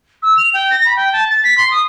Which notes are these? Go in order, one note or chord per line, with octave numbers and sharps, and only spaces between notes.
E6
F7
G5
A#6
B5
G5
A5
A6
B6
C6
D#6